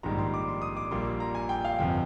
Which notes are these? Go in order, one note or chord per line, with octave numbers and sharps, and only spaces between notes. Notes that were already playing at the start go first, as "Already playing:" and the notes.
A#1 G#2 D#3 G3 A#5
C6
D6
C6
D#6
D6
A#1 A#2 G3 A#3 C6
A#5
G#5
G5
F5
G1 F2 C3 G5